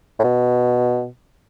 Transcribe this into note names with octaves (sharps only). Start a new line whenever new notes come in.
A2
B2